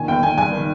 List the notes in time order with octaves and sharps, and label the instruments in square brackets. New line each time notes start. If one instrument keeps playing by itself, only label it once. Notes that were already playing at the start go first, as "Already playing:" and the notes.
Already playing: [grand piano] A#2 D#3 G#5
G1 G5
G1 G#5
G2 G#5
D#3